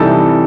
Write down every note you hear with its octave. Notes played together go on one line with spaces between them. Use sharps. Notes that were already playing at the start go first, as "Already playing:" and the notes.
Already playing: C3 E3 G3 D#4 A4